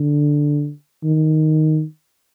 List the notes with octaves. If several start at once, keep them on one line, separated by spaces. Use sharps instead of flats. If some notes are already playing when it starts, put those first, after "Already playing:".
Already playing: D3
D#3